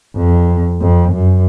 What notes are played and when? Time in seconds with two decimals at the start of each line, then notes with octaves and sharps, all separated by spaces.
0.17 F2
0.81 F2
1.13 F#2